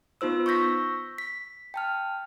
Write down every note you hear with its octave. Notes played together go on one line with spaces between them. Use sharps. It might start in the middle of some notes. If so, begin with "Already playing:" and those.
B3 D#4 F4 C5 E6
C#6 E6 G6 A#6 B6
B6
G5 A5 F6